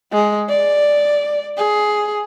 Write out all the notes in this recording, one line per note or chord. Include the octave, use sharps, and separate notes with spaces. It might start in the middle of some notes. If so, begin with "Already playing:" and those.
G#3
D5
G#4